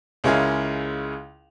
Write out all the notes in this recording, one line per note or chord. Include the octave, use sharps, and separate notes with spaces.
C#2 G#3 C#4 E4 A#4 F5